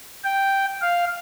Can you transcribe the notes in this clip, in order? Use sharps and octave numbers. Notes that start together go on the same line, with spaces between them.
G5
F5